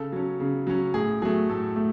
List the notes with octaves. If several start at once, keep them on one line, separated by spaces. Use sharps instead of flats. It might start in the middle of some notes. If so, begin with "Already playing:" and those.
Already playing: C#3 A4
F#3 C#4
C#3
F#3 C#4
A2 G#4
F#3 A3 G#4
A2 A4
A3